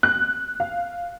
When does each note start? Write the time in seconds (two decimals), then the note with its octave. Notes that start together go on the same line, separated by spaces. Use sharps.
0.03 F#6
0.60 F5